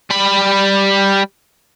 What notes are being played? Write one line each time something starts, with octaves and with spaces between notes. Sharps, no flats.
G3 B5